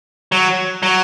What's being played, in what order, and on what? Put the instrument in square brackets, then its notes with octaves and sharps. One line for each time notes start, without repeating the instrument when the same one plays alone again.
[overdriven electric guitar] F#3
F#3